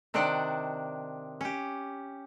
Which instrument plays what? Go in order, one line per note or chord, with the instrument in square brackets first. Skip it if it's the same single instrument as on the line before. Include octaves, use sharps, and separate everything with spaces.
[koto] C3 D#3 D4 C5 D5 F#5
C#4 G4